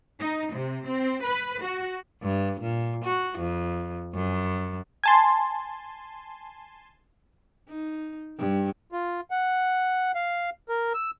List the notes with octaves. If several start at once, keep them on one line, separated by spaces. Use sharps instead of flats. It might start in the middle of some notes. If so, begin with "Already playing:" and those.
D#4
C3
C4
B4
F#4
G2
A#2
F#4
F2
F#2
G#5 A5 C6
D#4
G2
F4
F#5
F5
A#4
E6